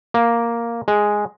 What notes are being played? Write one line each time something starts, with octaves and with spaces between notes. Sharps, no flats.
A#3
G#3